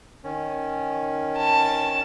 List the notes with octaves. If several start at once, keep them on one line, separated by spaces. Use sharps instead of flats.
D#3 C#4
A5